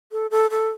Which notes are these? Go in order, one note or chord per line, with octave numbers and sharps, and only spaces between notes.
A4
A4
A4